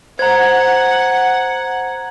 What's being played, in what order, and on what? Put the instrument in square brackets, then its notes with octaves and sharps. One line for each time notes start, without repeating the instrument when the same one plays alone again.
[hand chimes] C5 [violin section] F#5 [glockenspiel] A#5 G#6